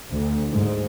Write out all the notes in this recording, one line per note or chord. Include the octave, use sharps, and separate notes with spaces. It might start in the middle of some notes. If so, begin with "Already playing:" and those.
D2
G#2